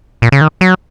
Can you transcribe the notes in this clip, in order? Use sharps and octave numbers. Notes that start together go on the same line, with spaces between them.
A#2
C#3
D#3
F#3